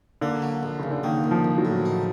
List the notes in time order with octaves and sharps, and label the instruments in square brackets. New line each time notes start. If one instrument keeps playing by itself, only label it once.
[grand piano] D3 [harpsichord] A#3
[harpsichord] F#3
A#1
[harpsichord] A#1 [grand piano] C#3
[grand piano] D3
[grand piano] D#3 [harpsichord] A#3
[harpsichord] A#1
[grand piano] F3
[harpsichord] A#1
[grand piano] F#3
[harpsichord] A2
D#4